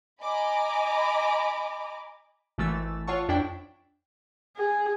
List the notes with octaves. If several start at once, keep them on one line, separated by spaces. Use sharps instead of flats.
D#5 G#5 A#5 B5 D6
G#1 E3 A3 E6 A6
F4 C#5 F#5 A5 C#6
F2 D4 E4 D5 G5
G#4